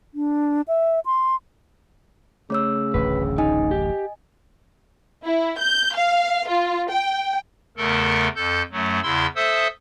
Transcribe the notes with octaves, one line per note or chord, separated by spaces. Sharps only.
D4
E5
C6
C#3 A3 C#5 E6
D1 A1 D2 B4
D#4 D#5 G#5
G4
E4
G6
F5
F4
G5
E2 C#3 A3 A4 A#4
F2 A4 G6
F#2 F#3 A3
E2 C#3 E4 C6 E6
A4 C5 E5 D#6 E6